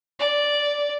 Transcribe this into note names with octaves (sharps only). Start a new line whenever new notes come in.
D5